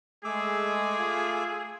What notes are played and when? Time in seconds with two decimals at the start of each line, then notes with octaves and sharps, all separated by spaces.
0.25 G#3 A3 G#4 D6 E6
0.98 F4